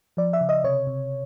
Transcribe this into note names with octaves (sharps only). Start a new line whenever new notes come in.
F3 D5
E5
C#3
D#5
C3 C#5
C3